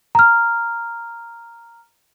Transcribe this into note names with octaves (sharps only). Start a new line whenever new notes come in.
A#5 F6